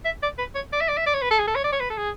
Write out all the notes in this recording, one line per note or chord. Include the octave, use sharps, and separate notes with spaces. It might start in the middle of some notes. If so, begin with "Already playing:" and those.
E5
D5
B4
C#5
D5
E5
D5
E5
D5
C#5
B4
A4
G#4
A4
C#5
D5
C#5
B4
A4
G#4